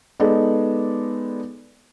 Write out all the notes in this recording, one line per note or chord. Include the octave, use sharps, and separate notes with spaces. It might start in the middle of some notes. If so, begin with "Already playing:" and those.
G#3 B3 D#4 A4 D5